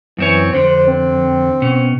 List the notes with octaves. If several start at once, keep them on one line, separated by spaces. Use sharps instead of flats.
F#2 E3 C4 C#5
F2 D3 C5
C4
B2 C#4